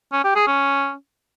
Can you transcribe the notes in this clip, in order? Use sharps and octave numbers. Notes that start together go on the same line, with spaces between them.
C#4
G4
G#4
C#4